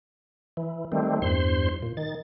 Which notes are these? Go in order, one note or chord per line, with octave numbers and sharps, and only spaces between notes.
E3
D#3 G3 A3 C4
E2 G2 C5 C6
A#2
D#3 A6